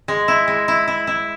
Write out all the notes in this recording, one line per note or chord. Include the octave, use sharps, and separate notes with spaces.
G#3
E4
G#3
E4
E4
E4